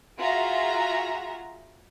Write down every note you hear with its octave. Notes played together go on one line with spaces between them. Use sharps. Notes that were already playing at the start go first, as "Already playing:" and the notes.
F4 F#4 G#4 E5 A#5